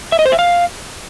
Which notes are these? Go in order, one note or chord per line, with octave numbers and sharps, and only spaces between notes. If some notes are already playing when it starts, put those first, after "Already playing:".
E5
D#5
C5
E5
F5